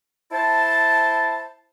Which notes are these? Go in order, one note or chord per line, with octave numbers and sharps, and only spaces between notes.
E4 C5 A5